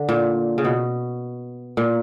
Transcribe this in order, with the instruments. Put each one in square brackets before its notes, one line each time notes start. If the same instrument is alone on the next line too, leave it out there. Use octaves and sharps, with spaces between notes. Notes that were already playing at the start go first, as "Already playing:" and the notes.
Already playing: [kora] D3
A#2
C#3
B2
A#2